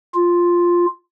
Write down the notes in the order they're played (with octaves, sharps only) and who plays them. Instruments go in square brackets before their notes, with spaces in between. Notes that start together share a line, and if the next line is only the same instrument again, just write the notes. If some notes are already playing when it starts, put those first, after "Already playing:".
[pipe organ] F4